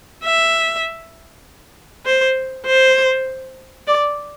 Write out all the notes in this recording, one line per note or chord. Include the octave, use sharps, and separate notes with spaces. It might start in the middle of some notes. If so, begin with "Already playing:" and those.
E5
C5
C5
D5